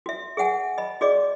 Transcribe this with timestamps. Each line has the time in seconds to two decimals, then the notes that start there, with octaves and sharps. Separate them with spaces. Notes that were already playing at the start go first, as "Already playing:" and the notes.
0.06 F#4 E5
0.37 G#4 E5 F#5 G#5
0.78 D#5 B5
1.01 F#4 G#4 D5 D#5 D6